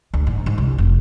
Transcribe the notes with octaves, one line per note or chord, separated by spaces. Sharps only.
D2
G#2
G#2
C2
F1